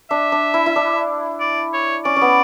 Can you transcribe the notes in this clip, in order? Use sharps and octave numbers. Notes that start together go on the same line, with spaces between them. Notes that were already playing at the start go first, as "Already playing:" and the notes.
D4 E5
D4
E4
E4
D4
D5
C#5
C#4 D5
C#4
B3